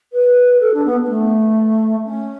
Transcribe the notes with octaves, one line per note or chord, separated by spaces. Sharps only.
B4
A4
D4
B3
B3
A3
C#4